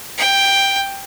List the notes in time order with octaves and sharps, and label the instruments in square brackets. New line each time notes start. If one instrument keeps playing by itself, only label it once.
[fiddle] G5